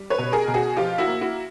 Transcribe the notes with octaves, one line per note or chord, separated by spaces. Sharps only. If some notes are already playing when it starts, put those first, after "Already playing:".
Already playing: G3
B4 C#5
B2
G#4 A#4
B2
F#4 G#4
F3 F4 G4
E4 F#4
A#3
E4 F#4